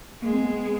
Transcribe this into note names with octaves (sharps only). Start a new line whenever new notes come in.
G#3 A#3
C4
B3